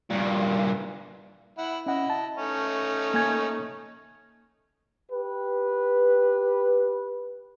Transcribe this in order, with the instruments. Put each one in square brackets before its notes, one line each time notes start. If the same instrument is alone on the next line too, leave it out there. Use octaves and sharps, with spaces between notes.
[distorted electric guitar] G2 A#2
[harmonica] E4 F#5
[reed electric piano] C#4 F#5 [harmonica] E4 D#5
[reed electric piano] A5
[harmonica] A3 C#4 D#4
[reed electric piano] A#3 G#5 G#6
[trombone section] G4 B4